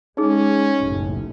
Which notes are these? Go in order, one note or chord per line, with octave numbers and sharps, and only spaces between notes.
G#3 C#4 D#4 G#4
F#1 B1 A2